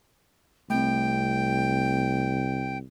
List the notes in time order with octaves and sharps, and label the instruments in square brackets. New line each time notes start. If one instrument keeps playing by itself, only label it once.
[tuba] C2 [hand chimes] A3 C4 [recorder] G5